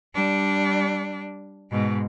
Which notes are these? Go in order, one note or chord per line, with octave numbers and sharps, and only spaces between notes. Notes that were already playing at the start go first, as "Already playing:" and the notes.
G3 D4
G#2 B2